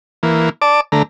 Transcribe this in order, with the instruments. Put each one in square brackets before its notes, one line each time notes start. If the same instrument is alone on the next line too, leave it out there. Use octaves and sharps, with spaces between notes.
[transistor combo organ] E3 A#3
D5 A5 D6
D3 A3 A#5